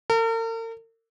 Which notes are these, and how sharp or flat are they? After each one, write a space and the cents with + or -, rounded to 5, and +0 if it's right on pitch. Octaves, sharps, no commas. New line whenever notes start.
A#4 -45